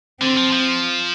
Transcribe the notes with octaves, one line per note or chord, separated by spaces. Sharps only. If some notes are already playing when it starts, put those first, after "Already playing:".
D3 C4
F3
F3